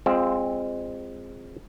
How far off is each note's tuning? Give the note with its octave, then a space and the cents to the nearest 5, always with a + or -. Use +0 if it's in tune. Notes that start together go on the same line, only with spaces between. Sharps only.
G#3 -20 C4 +5 F4 +0